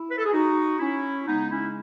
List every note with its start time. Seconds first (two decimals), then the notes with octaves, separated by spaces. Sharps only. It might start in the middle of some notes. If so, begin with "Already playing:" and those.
Already playing: E4
0.10 B4
0.18 A4
0.25 G#4
0.33 D#4 F#4
0.79 C#4 E4
1.27 C#3 G#3 B3 D#4
1.51 C#4 E4